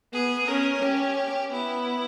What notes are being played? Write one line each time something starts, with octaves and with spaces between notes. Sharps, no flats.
B3 G#4
C#4 A#4
C#4 G4
B3 E4